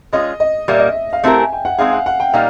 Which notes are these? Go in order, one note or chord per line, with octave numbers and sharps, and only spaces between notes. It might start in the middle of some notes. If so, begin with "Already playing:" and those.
G#3 C#4 F4 D#5
D#5
A#2 G3 A#3 E5
D#5
E5
F5
A3 C4 E4 G4 A#4 E5
G#5
G5
F#5
G#3 C4 D#4 G#4 F5
F#5
F#5
G5
A#2 G3 A#3 D#4 F5